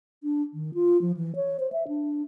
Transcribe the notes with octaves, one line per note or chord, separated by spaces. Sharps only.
D4
D#3
F4
F3
E3
C#5
C5
E5
D4